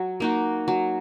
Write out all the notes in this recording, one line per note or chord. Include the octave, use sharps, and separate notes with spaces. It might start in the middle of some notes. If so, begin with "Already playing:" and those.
Already playing: F#3
A#3 D#4 F#4
F#3